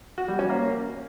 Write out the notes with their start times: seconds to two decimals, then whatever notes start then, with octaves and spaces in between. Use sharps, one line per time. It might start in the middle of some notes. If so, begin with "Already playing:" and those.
0.18 F#4
0.28 G3
0.39 C#4
0.49 A#3